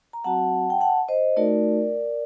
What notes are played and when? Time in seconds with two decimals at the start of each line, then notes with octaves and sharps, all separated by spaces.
0.13 A#5
0.24 F#3 C4 F#4 F#5 A5
0.70 G5
0.81 F#5 A5
1.08 C5 D#5
1.37 A3 D#4 F#4 A#4 D5